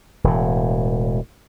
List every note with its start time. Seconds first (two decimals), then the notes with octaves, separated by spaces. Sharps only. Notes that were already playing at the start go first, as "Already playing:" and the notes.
0.24 E1 E2 A2